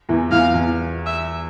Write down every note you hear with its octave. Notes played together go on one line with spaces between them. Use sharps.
E2 E3
E2 E3 F5
E2 E3
E5